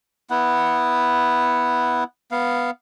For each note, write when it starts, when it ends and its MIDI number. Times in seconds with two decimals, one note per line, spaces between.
0.30 2.04 59
0.30 2.04 64
0.30 2.04 78
2.31 2.71 59
2.31 2.71 77